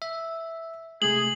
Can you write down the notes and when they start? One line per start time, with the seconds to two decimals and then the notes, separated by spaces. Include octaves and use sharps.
0.02 E5
1.02 C3 G#3 A3 G#4 F#7